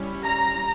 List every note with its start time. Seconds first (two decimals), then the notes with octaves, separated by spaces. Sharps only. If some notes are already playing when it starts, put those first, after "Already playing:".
Already playing: G3 C#4 E4
0.23 A#5